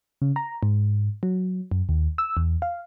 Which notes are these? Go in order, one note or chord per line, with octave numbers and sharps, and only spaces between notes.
C#3
A#5
G#2
F#3
F#2
D#2
E6
E2
F5